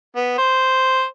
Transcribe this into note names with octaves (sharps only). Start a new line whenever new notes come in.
B3
C5